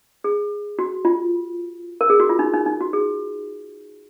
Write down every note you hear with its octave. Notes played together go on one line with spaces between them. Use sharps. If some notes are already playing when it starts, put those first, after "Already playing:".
G#4
F#4
F4
A#4
G#4
F#4
F4
D#4
D#4
D#4
F#4
G#4